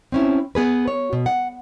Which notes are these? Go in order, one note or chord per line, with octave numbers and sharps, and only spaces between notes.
C4 C#4 E4
B3 G#4 B4
C#5
B2
F#5